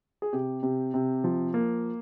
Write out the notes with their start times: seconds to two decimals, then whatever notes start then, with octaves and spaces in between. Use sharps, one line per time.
0.22 G#4
0.33 C3 G4
0.63 C3
0.94 C3
1.24 F3
1.54 A#3